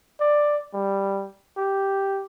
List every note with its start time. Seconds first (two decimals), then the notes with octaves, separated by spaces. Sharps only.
0.20 D5
0.74 G3
1.57 G4